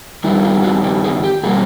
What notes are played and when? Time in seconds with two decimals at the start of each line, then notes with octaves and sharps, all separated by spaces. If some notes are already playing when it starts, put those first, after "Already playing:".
0.24 G2 D#3 G3 E4
0.45 F4
0.63 F#4
0.84 G4
1.04 G#4
1.24 G4
1.43 B2 G3 A#3 G#4